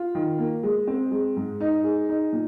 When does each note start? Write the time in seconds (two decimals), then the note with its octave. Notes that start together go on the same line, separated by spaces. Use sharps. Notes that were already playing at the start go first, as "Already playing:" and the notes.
Already playing: F4
0.15 D#3
0.38 A#3
0.63 G#3
0.87 C4
1.11 G#3
1.36 G#2
1.61 D#4
1.84 G#4
2.09 D#4
2.32 A#2